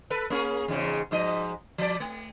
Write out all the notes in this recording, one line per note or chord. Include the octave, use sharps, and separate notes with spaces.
A4 B4
A#3 C#4 G#4
E2 G#2 C#3
G#2 F3 D#5
F3 D5
A3